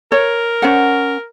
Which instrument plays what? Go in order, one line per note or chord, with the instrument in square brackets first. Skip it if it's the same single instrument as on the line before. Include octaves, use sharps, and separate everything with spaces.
[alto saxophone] A#4 [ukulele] C#5
[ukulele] C#4 C5 F#5